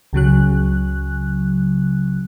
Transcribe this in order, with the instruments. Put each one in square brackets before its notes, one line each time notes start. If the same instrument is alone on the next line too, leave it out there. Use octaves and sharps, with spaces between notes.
[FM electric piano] C#2 C#3 F#3 F#6